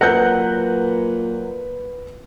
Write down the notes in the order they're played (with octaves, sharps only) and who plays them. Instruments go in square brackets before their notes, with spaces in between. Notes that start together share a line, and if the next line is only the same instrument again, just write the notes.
[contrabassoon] A#2 [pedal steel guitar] F#3 F#5 A#5 [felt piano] B4 F#6 G6